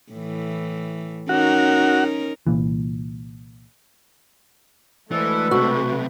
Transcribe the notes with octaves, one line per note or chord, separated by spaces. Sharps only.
A2 E3
C#4 D#4 F#4 A#4
C2 A#2 E3
D2 E3 G#3 A3 A4 B4
B1 C3 F#4